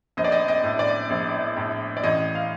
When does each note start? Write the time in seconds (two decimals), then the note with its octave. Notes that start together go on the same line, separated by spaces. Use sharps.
0.17 A#1 D#5
0.24 D5
0.32 D#5
0.48 D#5
0.64 A2
0.79 D5
1.10 A#1
1.57 A2
1.97 D5
2.03 A1 D#5
2.35 F5